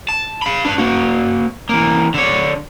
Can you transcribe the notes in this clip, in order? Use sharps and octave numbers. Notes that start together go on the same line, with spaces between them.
A5
F5 B5
D4 B4
A#3 F#4
E3 A#3
D3 C#5